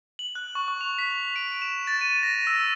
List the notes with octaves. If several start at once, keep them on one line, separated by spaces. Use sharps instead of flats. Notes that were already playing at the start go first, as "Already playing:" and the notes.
F#7
F#6
C#6
C#6
F7
B6
D7
E7
A6
D#7
A#6
E6